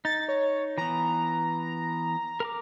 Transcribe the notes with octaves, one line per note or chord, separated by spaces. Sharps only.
D#4 A6
C#5
E3 B3 A#5
A#4 A#5 D6